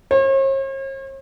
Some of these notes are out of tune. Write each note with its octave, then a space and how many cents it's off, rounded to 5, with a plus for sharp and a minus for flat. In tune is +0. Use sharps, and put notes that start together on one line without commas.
C#5 -45